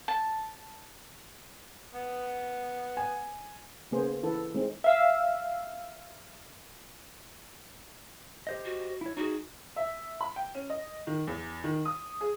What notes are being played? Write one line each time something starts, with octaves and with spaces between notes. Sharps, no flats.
A5
B3
G#5
C#3 A#3 B3 G#4 C5
E3 E4 A4 B4
G#3 C4 D#4
E5 F5 E6
G4 C5 D#5
F#4
E4 C#5
D#4 F#4 G#4
E5
B5
G5
C#4
D#5
D#3
E2
D#3
D#6
G#4